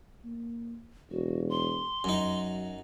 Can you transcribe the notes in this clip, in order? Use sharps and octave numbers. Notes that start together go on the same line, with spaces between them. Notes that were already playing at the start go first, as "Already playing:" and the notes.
A#3
E1 F#4
C6
F#2 F#3 D#4